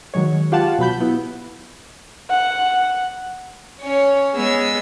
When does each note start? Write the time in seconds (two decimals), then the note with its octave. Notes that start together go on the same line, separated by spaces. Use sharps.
0.14 D#3 F#3 G#3 C#5
0.52 F4 G4 F5 F#5 A5
0.78 B2 F#3 B5 G6
1.01 B3 E4
2.30 F#5
3.80 C#4 C#5
4.34 G#3 B3 G#4 C#5 E6